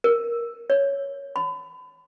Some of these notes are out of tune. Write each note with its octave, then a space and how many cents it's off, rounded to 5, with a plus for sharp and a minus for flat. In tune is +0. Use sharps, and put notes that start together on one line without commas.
A#4 +5
C#5 +5
B5 +35